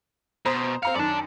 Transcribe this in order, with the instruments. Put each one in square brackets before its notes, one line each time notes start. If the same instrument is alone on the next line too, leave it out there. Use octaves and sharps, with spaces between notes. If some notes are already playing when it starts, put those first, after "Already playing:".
[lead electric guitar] B2 [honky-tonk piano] C5 A#5 D#6
[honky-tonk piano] C4 A#5 C#7 [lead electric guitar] F5
[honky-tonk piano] F#2 D#3 [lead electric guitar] D5 A5